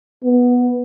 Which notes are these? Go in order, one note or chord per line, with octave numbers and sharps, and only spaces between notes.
B3